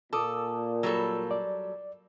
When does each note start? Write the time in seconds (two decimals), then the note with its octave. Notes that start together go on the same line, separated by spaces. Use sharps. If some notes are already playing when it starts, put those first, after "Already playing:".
0.13 A#2 A4 A5 D6 D#6
0.83 F#3 G3 A4
1.31 D5